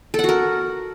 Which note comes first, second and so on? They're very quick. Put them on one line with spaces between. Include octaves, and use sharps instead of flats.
A4 F#5 F#4 A#4